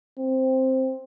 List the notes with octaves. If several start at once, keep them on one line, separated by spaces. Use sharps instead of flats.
C4